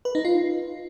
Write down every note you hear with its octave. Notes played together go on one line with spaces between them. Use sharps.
B4
D#4
F4